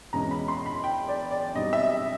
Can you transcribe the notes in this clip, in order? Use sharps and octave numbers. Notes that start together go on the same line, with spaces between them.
E2 B2 G#3 C#4 A#5
B5
C6
B5
G5
D5
D5
B2 G3 C4 D#4 D#5
E5